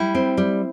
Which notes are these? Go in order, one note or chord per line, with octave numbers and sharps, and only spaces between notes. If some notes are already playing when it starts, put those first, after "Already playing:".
Already playing: G3 E4
C4
G3